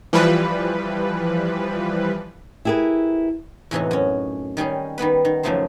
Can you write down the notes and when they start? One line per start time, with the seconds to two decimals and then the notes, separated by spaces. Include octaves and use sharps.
0.13 E3 F3 G3 B4
2.65 E4 G4 G#4 A#4 B4
3.71 E2 A2 C3 E3 D#4 F#4
3.91 F#2 C#4
4.57 D#3 G3 C#4 G#4
4.98 D#3 G3 B3 B4
5.25 D#3
5.43 F#2 C#3 F3 A3 D#4 C5